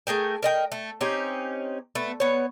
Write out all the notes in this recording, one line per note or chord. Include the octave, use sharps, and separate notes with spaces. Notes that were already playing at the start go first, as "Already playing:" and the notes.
A3 G#4 A#4 G5
A#4 D#5 G5
A3
C4 C#4 D#4 G4
A3 B3
B3 C#5